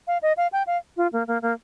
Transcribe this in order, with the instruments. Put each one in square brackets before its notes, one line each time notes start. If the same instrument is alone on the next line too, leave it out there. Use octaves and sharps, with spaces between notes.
[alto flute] F5
D#5
F5
G5
F5
F4
A#3
A#3
A#3